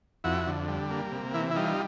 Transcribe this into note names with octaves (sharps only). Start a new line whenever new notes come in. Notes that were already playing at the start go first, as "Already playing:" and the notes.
F2 E4 F#4
D3
G3
A#3
C3
E3 E4
E4
G3 D#4 F4